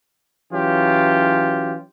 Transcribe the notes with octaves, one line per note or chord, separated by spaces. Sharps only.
E3 F#3 C#4 F4 G4